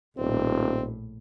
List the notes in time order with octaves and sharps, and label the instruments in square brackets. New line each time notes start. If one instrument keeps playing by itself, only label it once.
[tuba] D#1 [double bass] A#1 A2 [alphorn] C4